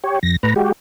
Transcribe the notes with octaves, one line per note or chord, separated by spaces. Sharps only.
G4 C#5
F2 A#6
A2 B4 A#5
G#3 F#4 G4